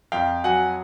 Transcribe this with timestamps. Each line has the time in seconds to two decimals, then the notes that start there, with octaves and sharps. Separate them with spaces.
0.12 F2 F5 G5
0.44 F#3 F#5 G#5